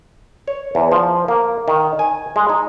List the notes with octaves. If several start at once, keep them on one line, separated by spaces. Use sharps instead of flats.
C#5
E2
F3
A#3
D#3
G#5
G#3
D#4